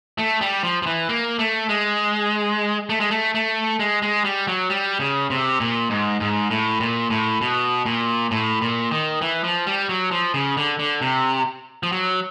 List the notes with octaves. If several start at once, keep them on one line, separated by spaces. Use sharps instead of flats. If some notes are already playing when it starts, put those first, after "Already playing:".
A3
G3
F3
F3
E3
A#3
A3
G#3
A3
G#3
A3
A3
G#3
G#3
G3
F#3
G3
C#3
C3
A#2
G#2
G#2
A2
A#2
A2
B2
A#2
A2
A#2
D#3
E3
F3
G3
F#3
F3
C#3
D3
D3
C3
F3
F#3